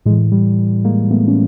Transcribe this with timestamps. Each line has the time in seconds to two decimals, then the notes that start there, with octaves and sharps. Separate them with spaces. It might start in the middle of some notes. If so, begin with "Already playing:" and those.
0.06 A2 G#3
0.10 E3
0.32 G3
0.85 G#3 A#3
1.11 A3 B3
1.28 C#4